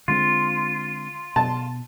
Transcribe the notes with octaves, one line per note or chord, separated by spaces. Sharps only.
D3 G#3 C4 F4
B2 A5